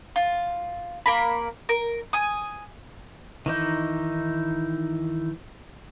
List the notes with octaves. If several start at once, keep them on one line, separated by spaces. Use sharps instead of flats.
F4
A#3 A#4 B5
A#4
G#5 D#6
D#3 E3 D#4